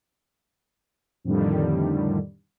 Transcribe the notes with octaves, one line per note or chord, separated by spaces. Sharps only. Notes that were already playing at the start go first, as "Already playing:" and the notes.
F2 A2 D3 D#3 G3